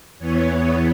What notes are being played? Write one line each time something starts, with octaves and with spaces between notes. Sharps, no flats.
E2 E3 B3 C#5